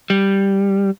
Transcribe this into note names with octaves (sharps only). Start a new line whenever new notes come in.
G3